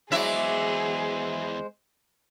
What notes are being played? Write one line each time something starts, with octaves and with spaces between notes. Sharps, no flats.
E2 F#3 G#3 E4 G#4 C5 D5 E5